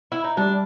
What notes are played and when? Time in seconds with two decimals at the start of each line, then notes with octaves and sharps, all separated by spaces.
0.12 E4
0.24 D#4
0.37 G3 D4